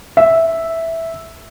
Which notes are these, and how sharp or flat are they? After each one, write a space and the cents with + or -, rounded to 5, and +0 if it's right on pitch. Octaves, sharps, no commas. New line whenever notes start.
E5 -5